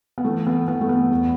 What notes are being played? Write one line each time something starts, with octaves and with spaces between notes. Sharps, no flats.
B3
E3 A3
B3
E3 B3
A3
B3
E2